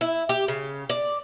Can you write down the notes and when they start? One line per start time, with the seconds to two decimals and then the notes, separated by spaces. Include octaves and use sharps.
0.01 E4
0.29 G4
0.48 C#3
0.90 D5